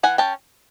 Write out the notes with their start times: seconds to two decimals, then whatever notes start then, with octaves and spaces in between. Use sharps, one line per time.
0.03 E3 F#5 G#5
0.18 C#4 G5 A5